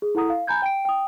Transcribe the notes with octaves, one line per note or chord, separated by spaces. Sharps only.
G#4
E4 A4 F#5 A#5 D#6
F5
G#5 A#5 B5 G6 G#6
G5 D7
G5 D#6